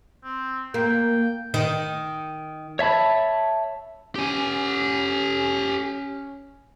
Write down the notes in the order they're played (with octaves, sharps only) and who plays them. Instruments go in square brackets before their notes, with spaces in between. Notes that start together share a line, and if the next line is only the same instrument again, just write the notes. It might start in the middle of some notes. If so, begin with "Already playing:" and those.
[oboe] C4
[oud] A#3 [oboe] G5
[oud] D#3
[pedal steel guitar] C#5 E5 A5 B5
[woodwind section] C#4 [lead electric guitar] G4 G#5